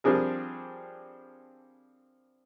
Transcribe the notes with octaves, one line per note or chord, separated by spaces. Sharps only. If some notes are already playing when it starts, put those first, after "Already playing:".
F3 G3 C4 D4 G#4 A#4